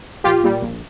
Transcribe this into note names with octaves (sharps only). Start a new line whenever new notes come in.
A#1 F4 G4
A#2 G3
A#1